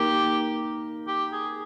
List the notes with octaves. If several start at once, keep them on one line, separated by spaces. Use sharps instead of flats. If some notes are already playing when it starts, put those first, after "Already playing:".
Already playing: A#3 D#4 G4 A#4
G4
G#4